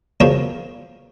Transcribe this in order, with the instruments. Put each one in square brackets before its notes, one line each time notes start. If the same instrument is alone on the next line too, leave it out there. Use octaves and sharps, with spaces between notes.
[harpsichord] F#2 C#3 F3 B3 A#4 C#5